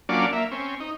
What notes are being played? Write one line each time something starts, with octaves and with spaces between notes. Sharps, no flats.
F#3 A#3 C#4 D4 F4 D5
A#3 E5
C4 C#4
D#4